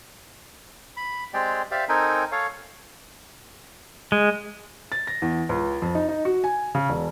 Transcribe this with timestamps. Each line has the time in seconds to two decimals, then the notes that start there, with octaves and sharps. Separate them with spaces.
0.97 B5
1.34 G#3 C4 G4 G#4 D5 G5
1.71 G4 C5 D5 E5 F5
1.89 C4 D#4 A4 A#4 G5 G#5
2.32 A4 C#5 F5
4.12 G#3
4.92 A6
5.07 A#6
5.22 E2
5.49 C#2
5.82 F2
5.95 D#4
6.09 D#4
6.25 F#4
6.44 G#5
6.75 C#3
6.89 E1